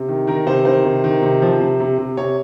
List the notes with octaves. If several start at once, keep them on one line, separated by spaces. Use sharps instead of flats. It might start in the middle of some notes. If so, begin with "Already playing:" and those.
Already playing: C3
D#3
D#3 A#4
C3 C5
D#3 C5
C3
D#3
C3
F3
C3
C3
C3
C3 C#5